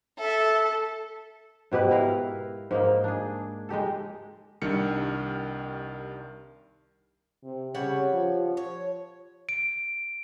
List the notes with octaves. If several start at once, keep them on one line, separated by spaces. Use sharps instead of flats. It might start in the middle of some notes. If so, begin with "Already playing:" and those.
A4 E5
G#2 B2 G4 B4
E4 A#4 F5
G#2 A#3 D#4
D4 G#4
G#3 D#4 G4 A4
C2 D#3 G3 D4 F6 C#7
C3
C#3 G3 C#5 F#5
F3
C#5
D7